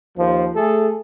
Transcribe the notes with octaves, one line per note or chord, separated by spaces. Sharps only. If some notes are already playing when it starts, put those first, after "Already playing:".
D#2 F3
A3 G#4 A4